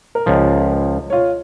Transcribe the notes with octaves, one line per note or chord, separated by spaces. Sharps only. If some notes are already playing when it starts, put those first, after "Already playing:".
A#4
C#2 F3
F4 C#5